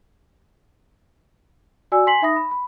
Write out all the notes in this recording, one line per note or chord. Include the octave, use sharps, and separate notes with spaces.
F#4 D5 G#5 E6
G#5 C6 B6 C7 F#7
D#4 E5 B5 D#6 A#6
B5
B5